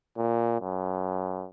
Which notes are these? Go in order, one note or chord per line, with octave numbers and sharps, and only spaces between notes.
A#2
F#2